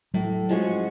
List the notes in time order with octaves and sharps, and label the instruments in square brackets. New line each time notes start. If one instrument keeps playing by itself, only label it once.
[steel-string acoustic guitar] A2 [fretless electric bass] F#3
[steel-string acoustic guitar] F3 G#3 C#4 F#4